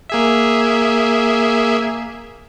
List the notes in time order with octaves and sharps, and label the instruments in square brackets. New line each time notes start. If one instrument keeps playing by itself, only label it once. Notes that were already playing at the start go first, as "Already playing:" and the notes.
[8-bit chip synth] A#3 G#4 E5